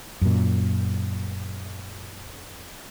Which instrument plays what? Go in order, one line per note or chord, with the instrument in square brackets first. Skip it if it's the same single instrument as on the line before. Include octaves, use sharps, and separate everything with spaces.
[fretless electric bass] F#2 A#2